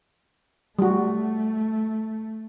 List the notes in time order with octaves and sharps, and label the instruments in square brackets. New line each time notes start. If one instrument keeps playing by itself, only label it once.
[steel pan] G3 F#4 [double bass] A3